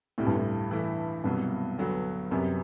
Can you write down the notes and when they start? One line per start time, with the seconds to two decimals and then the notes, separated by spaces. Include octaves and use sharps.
0.18 D2 A2 C3 G3
0.27 G2
0.35 A2
0.71 E3 A3 E4
1.24 C2 G2 B2 F#3
1.78 D2 D3 F#3 B3 F#4
2.31 F#2 C3 G3 B3